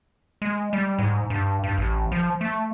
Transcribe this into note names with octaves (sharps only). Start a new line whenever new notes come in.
G#3
G3
G#2
G2
G2
A1
F3
A3